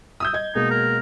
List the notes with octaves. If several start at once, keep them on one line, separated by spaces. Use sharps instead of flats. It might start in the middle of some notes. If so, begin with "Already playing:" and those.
D#6 E6 G6
D#5 G#6
B2 G#3 A#3 D#4
A#4